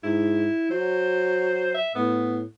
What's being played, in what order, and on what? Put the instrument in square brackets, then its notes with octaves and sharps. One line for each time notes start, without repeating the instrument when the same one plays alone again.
[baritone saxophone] G#2 [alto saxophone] E4
[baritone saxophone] F#3 [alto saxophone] C5
[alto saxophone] E5
[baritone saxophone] A2 [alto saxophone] B3